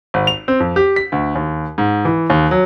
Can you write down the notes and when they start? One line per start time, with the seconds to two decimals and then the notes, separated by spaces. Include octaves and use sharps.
0.14 G#1
0.27 F7
0.48 C4
0.60 F2
0.76 G4
0.96 B6
1.12 D2
1.35 D#2
1.78 G#2
2.05 E3
2.30 D#2
2.51 F#3